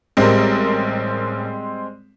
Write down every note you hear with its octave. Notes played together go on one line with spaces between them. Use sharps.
A1 G3 G#3 C4 A#4